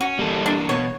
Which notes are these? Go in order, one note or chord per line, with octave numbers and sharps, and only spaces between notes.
C#4 F#4
E3 G3 A#3 A4
D4
B2 C#5